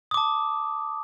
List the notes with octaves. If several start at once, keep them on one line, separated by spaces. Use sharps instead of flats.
A5 D6 D#6